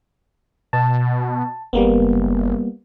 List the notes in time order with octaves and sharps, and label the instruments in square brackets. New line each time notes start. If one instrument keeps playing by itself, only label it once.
[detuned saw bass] B2 [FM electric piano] A5
[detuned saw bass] F#1 [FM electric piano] G3 A#3 B3